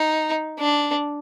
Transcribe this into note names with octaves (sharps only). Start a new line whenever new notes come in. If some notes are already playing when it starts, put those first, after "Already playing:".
Already playing: D#4
D4